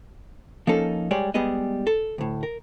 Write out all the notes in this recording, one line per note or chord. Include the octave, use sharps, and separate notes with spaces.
F3 A#3 C#4 D#4 A4
G3 G#3 C#5 D5
G3 G#3 B3 G#4 D#5
A4
D2 A2
A#4